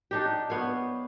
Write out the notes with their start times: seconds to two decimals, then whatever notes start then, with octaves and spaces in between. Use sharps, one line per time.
0.11 D4 D#4 G4
0.50 B3 C#5 F5